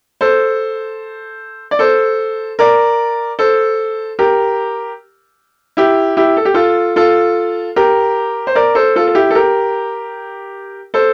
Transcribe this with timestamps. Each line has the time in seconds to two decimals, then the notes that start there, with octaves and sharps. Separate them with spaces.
0.21 A4 C5
1.71 D5
1.79 A4 C5
2.59 A#4 D5
3.39 A4 C5
4.19 G4 A#4
5.77 E4 G4
6.17 E4 G4
6.37 A4
6.45 G4
6.54 F4 A4
6.96 F4 A4
7.76 G4 A#4
8.47 C5
8.55 A#4 D5
8.75 A4 C5
8.96 F4 A4
9.08 A4
9.15 E4 G4
9.30 A4
9.35 G4 A#4
10.94 A4 C5